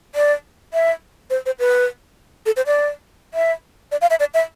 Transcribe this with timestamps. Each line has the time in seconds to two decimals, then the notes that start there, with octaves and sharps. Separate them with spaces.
0.15 D5
0.74 E5
1.30 C5
1.46 C5
1.59 B4
2.46 A4
2.56 C5
2.66 D5
3.34 E5
3.92 D5
4.01 F5
4.10 E5
4.20 D5
4.34 E5